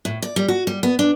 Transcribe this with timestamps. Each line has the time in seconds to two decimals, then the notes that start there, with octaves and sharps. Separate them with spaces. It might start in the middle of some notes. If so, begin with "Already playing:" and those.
0.05 A2
0.22 D5
0.36 G3
0.48 F#4
0.67 G3
0.83 B3
0.99 D4